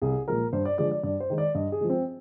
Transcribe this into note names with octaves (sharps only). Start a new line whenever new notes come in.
C2 G#4
A#2 F3 G#3 A#4
G2 C5
D5
D3 F3 G#3 D5
D5
G2 D5
C5
D#3 G#3
D5
G2 D#5
G#4
F3 G#3
C4